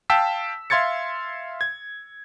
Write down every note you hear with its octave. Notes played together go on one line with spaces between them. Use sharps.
F5 G5 A5 E6 B6
E5 F5 C6 G#6 A6 C#7
G#6